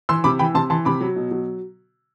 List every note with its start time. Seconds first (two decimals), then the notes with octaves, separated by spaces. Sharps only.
0.09 E3 C6 E6
0.24 C3 B5 D6
0.39 E3 G5 B5
0.55 C3 A5 C6
0.70 E3 A5 C6
0.85 C3 B5 D6
1.01 F#3
1.16 B2
1.31 F#3